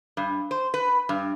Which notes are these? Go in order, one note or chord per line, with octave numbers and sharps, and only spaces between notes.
G2
C5
B4
G2